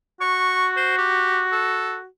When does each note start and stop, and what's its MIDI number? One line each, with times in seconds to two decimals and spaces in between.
0.21 2.06 66
0.21 0.70 85
0.77 0.95 72
0.98 1.42 67
1.52 1.96 69